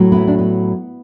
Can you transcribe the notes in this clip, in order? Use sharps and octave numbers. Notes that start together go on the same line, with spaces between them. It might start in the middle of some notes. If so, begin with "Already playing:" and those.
Already playing: A2 F#3
B3 E4
D4
B3